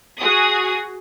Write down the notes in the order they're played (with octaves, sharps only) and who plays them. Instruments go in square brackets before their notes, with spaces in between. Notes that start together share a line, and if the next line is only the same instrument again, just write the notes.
[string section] F#4 G#4 D#6